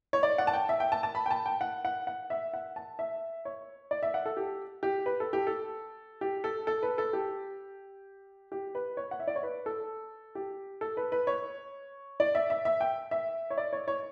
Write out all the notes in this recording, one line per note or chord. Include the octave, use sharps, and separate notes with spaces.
C#5
D5
F#5
A5
G5
E5
G5
A5
A5
B5
G5
A5
G5
F#5
F#5
F#5
E5
F#5
A5
E5
C#5
D5
E5
F#5
A4
G4
G4
B4
A4
G4
A4
G4
A4
A4
B4
A4
G4
G4
B4
C#5
F#5
E5
D5
C#5
B4
A4
G4
A4
B4
B4
C#5
D5
E5
E5
E5
G5
E5
C#5
D5
C#5
C#5